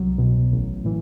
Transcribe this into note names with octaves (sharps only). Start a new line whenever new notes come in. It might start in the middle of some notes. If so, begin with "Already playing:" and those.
Already playing: C2 F#3
B2
A1
A2 E3